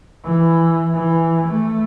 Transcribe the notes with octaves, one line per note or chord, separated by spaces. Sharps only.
E3
E3
A3